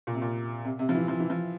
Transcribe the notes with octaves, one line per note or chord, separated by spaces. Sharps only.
A#2
C3
A#2
C3
C3
F3
E3
F3
E3
F3